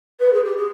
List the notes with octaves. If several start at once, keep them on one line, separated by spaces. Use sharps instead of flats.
B4
G#4
G4
G#4